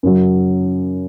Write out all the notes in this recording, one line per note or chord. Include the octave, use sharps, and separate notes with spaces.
F#2 C#3 F#3